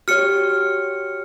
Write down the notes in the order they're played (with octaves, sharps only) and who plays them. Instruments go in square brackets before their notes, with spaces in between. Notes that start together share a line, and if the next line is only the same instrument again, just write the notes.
[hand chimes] F#4 G4 C#5 [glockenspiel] F6 C#7